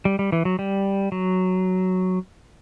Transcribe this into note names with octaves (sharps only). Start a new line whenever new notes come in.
G3
G3
E3
F#3
G3
F#3